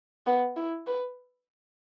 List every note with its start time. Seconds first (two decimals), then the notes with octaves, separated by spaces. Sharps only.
0.27 B3
0.57 E4
0.87 B4